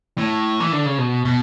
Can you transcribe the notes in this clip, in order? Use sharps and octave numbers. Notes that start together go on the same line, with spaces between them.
A2
E3
D3
C#3
B2
B2